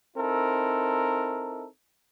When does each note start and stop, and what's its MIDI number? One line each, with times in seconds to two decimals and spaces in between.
0.17 1.66 60
0.17 1.66 63
0.17 1.66 64
0.17 1.66 69
0.17 1.66 70